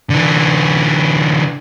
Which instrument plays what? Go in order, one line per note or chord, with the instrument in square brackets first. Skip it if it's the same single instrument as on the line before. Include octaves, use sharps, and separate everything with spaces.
[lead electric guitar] D3 E3